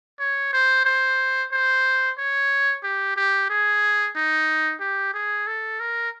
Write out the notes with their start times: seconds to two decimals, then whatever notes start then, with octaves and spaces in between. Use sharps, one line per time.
0.19 C#5
0.53 C5
0.85 C5
1.52 C5
2.18 C#5
2.83 G4
3.16 G4
3.50 G#4
4.15 D#4
4.80 G4
5.14 G#4
5.47 A4
5.80 A#4